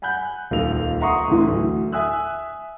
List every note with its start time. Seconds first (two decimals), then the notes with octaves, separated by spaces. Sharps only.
0.02 F#5 G#5 B5 F#6 G6
0.51 D#1 C#2 A#3 D#4 A4 F7
1.01 E5 F#5 A#5 C6 C#6 D#6
1.27 A1 D2 D3 E3
1.47 D2 F#3
1.92 E5 G#5 D#6 E6 F#6